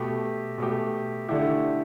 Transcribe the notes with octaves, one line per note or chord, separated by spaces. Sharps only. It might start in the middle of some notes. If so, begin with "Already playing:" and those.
Already playing: B2 A3 G4
B2 A3 G4
D3 A3 E4 G4